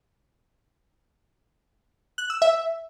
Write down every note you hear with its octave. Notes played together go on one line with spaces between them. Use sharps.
F#6
E6
E5